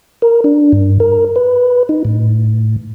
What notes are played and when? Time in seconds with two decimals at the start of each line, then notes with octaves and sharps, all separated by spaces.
0.22 A#4
0.44 D4
0.72 G2
1.00 A#4
1.36 B4
1.89 D#4
2.05 A2